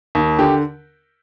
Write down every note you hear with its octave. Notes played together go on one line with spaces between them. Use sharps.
D#2
D3 G4